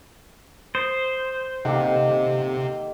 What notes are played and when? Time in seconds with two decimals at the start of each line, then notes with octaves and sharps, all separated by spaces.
0.75 C5 D#6
1.65 C3 D#3 A#3 G4 A4 F#5